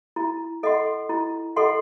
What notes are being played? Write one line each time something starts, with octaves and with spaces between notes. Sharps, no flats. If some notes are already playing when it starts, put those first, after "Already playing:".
E4
A4 D#5 F#5 C6
E4
A4 D#5 F#5 C6